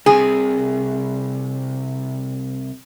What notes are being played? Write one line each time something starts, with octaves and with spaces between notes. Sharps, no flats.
C2 C3 G#4